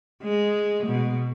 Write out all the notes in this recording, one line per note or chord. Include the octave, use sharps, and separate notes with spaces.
G#3
B2